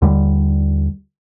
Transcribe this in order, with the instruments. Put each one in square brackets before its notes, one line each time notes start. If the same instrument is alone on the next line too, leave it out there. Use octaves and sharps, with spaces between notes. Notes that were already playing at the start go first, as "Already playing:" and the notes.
[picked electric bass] D#2 D3 G3